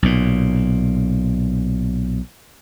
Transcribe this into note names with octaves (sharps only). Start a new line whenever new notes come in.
B1 A#2